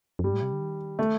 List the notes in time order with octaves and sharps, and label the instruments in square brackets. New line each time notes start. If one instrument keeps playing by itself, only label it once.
[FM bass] F2
[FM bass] G2 [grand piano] G3
[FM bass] A2
C3
D3
D#3
[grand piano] A3